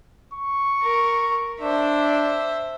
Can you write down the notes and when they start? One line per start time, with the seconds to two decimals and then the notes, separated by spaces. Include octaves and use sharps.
0.33 C#6
0.82 A#4
1.61 D4 C5 E5